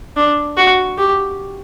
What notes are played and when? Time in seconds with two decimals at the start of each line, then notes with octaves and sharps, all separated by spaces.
0.17 D4
0.57 F#4
0.98 G4